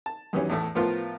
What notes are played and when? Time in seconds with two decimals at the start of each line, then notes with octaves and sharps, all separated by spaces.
0.06 A5
0.33 F#2 D#3 E3 G3 C#4
0.49 E2 A2 A3
0.75 A2 F3 B3 F4 A#4 C6